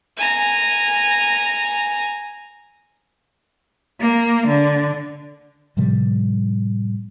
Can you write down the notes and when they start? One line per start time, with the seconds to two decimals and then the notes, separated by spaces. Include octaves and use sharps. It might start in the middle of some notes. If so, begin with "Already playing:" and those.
0.17 G#5 A#5
4.01 A#3
4.47 D3
5.77 A2 C3 F3 G3